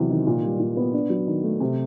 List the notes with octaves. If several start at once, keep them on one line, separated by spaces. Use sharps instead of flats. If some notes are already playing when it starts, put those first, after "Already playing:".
Already playing: E2 C3 F#3
D#3
A#2
G3
A#2
B3
D4
F#3
D#3
A3
C3